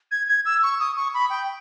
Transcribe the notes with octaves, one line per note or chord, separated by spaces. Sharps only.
G#6
G#6
E6
C#6
D#6
C#6
B5
G5